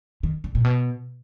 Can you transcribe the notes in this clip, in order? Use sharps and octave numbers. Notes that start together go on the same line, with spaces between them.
D#3
D3
A#2
B2